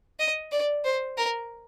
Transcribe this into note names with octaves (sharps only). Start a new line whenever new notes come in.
D#5
D5
C5
A#4